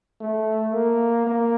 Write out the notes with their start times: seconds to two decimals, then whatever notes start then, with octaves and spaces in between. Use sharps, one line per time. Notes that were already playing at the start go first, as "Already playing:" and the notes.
0.21 A3
0.73 A#3
1.27 A#3